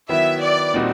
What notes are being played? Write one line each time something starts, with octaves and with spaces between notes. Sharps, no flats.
D#3 F#3 B3 E4 E5
D5
A#2 G3 C4 D#4 F#4